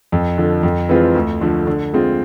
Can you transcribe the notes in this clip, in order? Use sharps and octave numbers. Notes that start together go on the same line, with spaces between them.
F2
D3 F3
F2
E3 G#3 C4 F4
D2
D3 F3 A3
D3
G#3 C4 F4